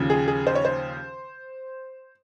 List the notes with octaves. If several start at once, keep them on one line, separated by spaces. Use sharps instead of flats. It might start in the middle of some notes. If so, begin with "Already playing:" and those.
Already playing: D#2 C#3 F3
G#4
G#4
C5
C#5
C5